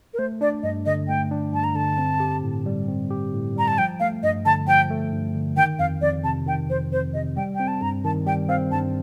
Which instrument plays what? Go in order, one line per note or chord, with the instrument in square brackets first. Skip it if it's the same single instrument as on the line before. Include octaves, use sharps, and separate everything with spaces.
[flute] A#4
[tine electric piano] A3 [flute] C5
[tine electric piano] D4 [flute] D5
[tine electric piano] G2 [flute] D#5
[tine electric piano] D3 [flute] D#5
[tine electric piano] A3 [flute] G5
[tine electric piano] D4
[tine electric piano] G2 [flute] A5
[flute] A#5
[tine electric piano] D3 [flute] A5
[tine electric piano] C4
G4
A2
G3
C4
G4
A2
[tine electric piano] G3 [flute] A#5
[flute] A5
[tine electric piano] F3 [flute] G5
[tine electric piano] A3 [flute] F5
[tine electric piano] G2 [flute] D#5
[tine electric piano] D3 [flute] A5
[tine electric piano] F3 [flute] G5
[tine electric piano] A3
G2
D3
[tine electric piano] D#3 [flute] G5
[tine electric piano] F2 [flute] F5
[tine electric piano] F2 [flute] D5
[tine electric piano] C3 [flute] A5
[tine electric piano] D#3 [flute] G5
[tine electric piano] F2 [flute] C5
[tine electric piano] F2 [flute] C5
[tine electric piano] C3 [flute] D#5
[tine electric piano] G3 [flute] G5
[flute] G5
[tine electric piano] C4
[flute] A5
[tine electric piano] G2 [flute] A#5
[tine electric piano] D#3 [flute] A5
[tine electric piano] G3 [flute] G5
[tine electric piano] C4 [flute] F5
[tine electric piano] G2 [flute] A5